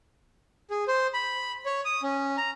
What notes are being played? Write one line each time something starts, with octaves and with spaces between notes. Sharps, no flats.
G#4
C5
B5
C#5
D#6
C#4
A#5